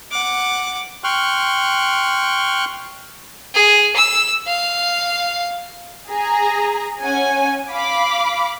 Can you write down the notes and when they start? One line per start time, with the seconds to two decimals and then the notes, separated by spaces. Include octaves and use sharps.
0.11 F#5 D6
1.04 G5 C6 C#6 F6 F#6
3.54 G#4
3.96 E6
4.47 F5
6.10 G#4 A#5
7.02 C#4 F#5 G#5
7.71 F5 B5 D6